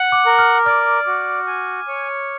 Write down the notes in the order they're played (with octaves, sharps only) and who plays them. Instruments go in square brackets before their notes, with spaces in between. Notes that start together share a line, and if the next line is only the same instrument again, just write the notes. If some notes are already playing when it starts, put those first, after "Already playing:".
Already playing: [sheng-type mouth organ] F#5
[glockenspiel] D6
[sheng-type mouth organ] A#4
[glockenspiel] F6
[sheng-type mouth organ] D5 [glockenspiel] F6
[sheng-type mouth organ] F#4
G#5
C#5